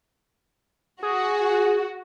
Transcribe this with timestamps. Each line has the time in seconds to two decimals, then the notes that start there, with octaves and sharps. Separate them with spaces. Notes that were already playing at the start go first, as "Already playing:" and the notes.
1.03 F#4 G#4